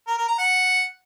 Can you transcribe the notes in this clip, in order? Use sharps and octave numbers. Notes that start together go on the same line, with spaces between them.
A#4
A#4
A#5
F#5